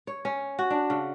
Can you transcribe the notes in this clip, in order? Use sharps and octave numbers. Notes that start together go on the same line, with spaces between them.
C#5
C#4
F#4
D4
C#3